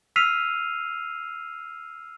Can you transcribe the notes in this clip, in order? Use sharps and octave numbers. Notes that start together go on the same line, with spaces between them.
E6 F6 B6 C7 D#7 F7